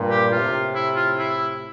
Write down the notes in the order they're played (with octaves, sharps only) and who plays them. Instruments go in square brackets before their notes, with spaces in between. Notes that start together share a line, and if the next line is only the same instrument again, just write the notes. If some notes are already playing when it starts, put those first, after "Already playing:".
Already playing: [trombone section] G2 A#2
[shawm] G4
[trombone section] A2 C3 [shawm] F4
[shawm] E4
F4
E4